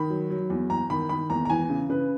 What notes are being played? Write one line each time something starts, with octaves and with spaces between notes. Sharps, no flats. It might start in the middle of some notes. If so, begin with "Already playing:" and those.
Already playing: D#3 B5
F#3
F#3
E2
E2 A#5
D#3 B5
D#3 B5
E2 A#5
A#5
E3 G#5
C#3
C#3 B4